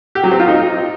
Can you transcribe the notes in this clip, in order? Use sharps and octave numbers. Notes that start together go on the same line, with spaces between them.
G4
F#3
C4
F4
D#4